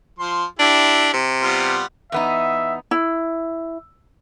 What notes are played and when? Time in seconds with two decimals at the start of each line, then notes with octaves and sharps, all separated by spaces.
0.18 F3 C6
0.59 D4 E4 G4
1.14 C3
1.42 G3 B3 F4
2.12 E2 B3 D#4 E5
2.91 E4